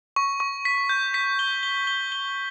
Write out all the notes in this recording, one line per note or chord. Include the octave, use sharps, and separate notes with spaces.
C#6
C#6
B6
G6
B6
G7
G7
G7
G7